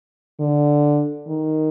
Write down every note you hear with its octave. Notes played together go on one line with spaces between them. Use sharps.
D3
D#3